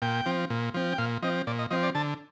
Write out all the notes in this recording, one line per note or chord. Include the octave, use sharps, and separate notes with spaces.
A#2 G5
F3 C4
A#2
F3 C4
G5
A#2 F5
F3 C4 D#5
A#2 D5
D#5
F3 C4 D#5
D5
D3 A5